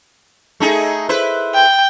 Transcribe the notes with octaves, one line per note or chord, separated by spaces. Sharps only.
A3 D#4 G#4
E4 B4 C5
G5